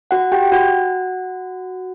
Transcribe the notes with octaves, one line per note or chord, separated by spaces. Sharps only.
F#4 F#5
G4 G5
F#4 F#5